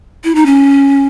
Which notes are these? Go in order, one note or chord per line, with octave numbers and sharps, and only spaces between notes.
E4
D#4
C#4